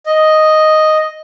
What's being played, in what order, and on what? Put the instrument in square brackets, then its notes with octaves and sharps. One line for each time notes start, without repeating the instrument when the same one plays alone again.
[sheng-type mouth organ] D#5